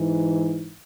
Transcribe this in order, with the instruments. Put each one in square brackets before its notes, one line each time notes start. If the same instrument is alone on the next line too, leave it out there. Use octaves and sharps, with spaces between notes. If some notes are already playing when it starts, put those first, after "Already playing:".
Already playing: [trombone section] G#2 E3